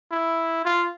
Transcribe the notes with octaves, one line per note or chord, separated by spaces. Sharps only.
E4
F4